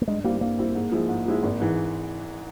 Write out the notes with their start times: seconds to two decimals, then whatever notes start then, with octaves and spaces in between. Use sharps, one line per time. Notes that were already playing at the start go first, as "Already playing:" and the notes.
0.02 A#3
0.08 G2 G#3
0.24 G3 A#3 C4 E4
0.41 G2 A#3
0.59 G3 C4 E4
0.75 G#2
0.92 F3 G#3 E4
1.09 G#2
1.26 F3 G#3 E4
1.43 G#1
1.60 G#2 E3